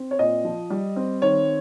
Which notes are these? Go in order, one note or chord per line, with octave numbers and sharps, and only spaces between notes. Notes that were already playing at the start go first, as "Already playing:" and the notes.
Already playing: C4
C#5
A#2 D#5
F3
G3
C4
D#3 C#5